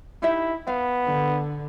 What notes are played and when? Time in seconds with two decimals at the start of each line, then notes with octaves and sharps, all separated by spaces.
0.22 D#4 E4 G4 E5
0.67 B3 F5
1.04 D3